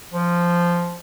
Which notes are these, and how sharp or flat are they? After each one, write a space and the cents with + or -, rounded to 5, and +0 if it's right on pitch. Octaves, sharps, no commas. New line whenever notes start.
F3 -5